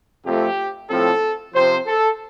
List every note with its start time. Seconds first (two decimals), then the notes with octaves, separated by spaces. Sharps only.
0.24 F2 C3 F3 A3 C4 G4
0.89 A2 F3 C4 A4
1.54 C3 F3 C4 C5
1.87 A4